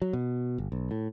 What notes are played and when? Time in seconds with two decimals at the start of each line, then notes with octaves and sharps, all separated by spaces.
0.02 F#3
0.13 B2
0.58 G1
0.72 B1
0.91 A2